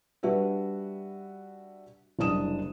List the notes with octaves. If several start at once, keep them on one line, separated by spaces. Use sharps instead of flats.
G3 D4 F#4 B4 E5
F#1 C2 D4 D#6 E7